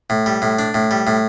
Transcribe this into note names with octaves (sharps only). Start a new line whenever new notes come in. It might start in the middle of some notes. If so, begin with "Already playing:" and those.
A2
G3
A2
D4
A2
G3
A2